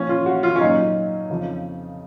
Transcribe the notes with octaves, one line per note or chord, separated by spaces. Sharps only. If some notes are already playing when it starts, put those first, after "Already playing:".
Already playing: A#2 F3 C#4
F4
F#4
F4
C#4
A#2 F#3 D#4
F2 C#3 F3